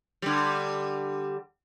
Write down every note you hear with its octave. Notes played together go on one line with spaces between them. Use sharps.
D3 G3